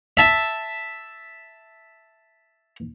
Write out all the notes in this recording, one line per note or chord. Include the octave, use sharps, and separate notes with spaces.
E5 A5